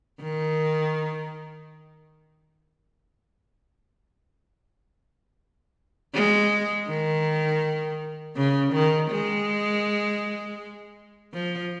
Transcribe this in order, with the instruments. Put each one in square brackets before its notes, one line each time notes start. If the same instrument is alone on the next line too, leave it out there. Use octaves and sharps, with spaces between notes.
[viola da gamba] D#3
G#3
D#3
C#3
D#3
G#3
F3